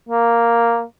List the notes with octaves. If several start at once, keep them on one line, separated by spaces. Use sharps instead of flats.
A#3